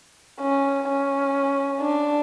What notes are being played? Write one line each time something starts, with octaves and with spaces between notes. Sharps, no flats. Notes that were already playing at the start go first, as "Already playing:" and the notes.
C#4
C#4
D4